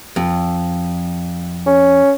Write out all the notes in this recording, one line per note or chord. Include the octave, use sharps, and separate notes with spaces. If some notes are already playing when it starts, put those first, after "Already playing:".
F2
C#4